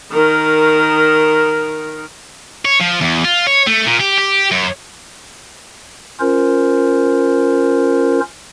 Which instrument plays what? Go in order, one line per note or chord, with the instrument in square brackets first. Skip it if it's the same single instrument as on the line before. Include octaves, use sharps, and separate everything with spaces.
[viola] D#3 A#4
[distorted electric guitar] C#5
F3
E2
F4
C#5
A3
A#2
G4
G4
F#2
[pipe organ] C#4 F4 A#4 C5